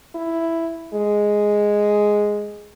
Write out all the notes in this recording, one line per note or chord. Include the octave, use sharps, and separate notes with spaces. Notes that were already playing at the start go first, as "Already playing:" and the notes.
E4
G#3